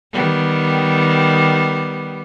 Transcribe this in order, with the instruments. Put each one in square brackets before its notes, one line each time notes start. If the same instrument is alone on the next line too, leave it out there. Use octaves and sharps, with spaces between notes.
[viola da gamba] D#3 G3 B3